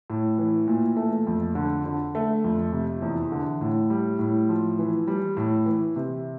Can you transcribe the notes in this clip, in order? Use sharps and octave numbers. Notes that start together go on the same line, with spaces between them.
A2
E3
A#2
A3
F2
D3
D3
A3
F2
C3
E2
D3
A2
G3
A2
F3
E3
G3
A2
E3
C3